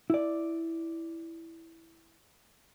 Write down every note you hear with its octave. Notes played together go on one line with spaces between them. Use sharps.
E4 D5